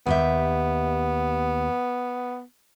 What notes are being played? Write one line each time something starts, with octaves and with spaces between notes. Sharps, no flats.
D#2 B3 G4 E5